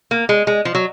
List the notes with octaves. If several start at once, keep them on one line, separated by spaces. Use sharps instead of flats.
A#3
G#3
G#3
F3
F#3